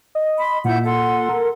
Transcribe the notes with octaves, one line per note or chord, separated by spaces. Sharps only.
D#5
B5 C6
A#2 E4 F#5 G6
A4 F#5 C6
A#4